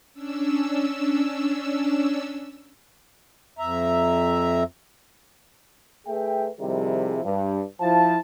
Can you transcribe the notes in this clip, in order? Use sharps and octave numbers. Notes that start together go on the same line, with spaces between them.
C#4 D4 E6
F2 E5 A#5
A3 G#4 B4 E5 G5
C3 D#3 F3 G3 E4 G#4
G2
F3 E4 A5